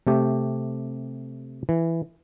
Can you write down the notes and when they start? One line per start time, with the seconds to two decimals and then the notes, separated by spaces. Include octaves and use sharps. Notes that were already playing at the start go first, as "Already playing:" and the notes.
0.07 C3 A3 G4
1.69 E3